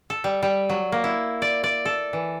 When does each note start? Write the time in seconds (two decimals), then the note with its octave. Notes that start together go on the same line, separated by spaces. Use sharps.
0.10 A4
0.24 G3
0.43 G3
0.69 F#3
0.92 A#3
1.04 E4
1.42 D5
1.64 D5
1.85 A4
2.13 E3